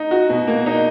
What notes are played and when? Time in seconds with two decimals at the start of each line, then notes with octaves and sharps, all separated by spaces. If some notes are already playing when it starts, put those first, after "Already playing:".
Already playing: D#4
0.11 F#4
0.29 B2
0.47 A#3
0.66 D#4